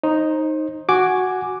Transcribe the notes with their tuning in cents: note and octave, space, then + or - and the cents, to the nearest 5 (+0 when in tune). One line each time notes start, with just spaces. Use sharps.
D#4 +0 C5 +30
F#4 +0 G#5 +0 D6 +0